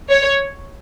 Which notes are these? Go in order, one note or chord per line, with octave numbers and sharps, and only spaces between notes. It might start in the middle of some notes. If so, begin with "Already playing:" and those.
C#5